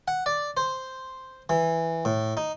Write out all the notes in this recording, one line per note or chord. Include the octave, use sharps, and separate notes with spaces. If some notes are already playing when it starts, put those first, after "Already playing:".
F#5
D5
C5
E3
A2
D#4